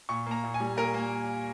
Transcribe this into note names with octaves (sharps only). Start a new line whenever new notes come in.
A#2 C#6
A#3 A#5
A#2
G#5
G3
A#2 A#4
A#3